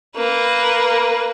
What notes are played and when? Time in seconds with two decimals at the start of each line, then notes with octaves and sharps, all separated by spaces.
0.17 A#3 B4